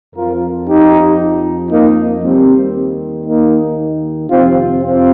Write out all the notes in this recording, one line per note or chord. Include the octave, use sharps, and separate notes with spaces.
F2 F3 F4 A#4
D#4 G4
A#3 D#4
D#2 D#3 G3 C4
A#3 D#4
F2 C3 F3 C4 F4
C4 F4